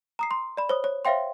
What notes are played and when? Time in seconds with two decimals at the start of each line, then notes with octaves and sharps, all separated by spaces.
0.19 A#5 D#6 C7
0.31 C6
0.57 D5 B5
0.69 C5 C#5 D#6
0.84 C#5
1.05 C5 C#5 E5 F5 G5 C6